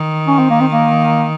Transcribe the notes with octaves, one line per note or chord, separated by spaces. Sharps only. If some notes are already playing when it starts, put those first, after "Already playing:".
Already playing: D#3
C#4
C4
A#3
C4
A#3